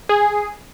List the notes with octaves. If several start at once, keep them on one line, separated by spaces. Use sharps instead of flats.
G#4